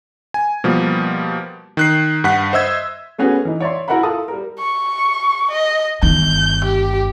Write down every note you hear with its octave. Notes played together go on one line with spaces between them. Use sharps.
G#5
B2 F3 G3 A#3
D#3 F#6 C7
G2 F#5 B6
C5 D#5 E5 E6 G#6
A3 B3 C#4 F#4 G#4 B4
E3 D#4
C#5 D5 E5 C6
E4 F#4 A#4 E5 F#5 B5
E4 F4 A4 A5 D#6
G3 A#4
C#6
D#5
G1 D#3 G6
G4